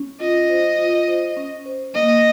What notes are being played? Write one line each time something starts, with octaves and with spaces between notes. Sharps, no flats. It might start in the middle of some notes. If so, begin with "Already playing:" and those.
Already playing: C#4
F4 D#5
C5
F4
C5
C#4
C5
A#3 D#5